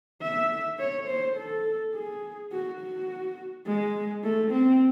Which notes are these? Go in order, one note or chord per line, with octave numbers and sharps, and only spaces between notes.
E5
C#5
C5
A4
G#4
F#4
F#4
G#3
A3
C4